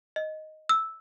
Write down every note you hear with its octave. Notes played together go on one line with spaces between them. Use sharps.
D#5
E6